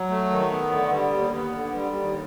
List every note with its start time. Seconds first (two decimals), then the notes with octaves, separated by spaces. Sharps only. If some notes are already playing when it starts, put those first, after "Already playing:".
Already playing: F#3
0.10 A3
0.30 D#3
0.51 B3
0.72 D3
0.92 G3
1.13 D#2
1.33 B3
1.55 D3
1.75 G3
1.95 D#2